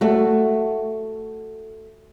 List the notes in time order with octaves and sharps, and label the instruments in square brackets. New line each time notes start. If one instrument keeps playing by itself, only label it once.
[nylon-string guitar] A3 F#4